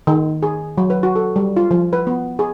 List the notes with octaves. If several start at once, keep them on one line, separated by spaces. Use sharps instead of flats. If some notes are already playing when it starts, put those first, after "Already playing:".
D#3
G#4
F#3
B4
F#4
A4
G3
F4
F3
B4
B3
G#4